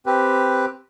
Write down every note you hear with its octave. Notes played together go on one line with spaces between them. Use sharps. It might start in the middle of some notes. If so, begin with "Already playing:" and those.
C4 G4 B4